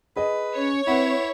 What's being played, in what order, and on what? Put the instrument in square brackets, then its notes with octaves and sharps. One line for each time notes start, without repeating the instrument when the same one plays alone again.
[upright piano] G#4 D#5 [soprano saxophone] B4
[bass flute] C#4 [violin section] C#5
[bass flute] C4 [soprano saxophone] E4 [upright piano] B4 F#5